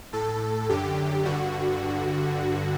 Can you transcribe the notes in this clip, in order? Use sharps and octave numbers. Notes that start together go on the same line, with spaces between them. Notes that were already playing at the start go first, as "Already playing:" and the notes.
A2 A4
F#2 D3 G4
G2 D3 F#4